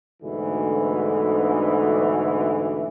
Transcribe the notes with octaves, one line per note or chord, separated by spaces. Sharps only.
D2 G#2 B2 D3 E3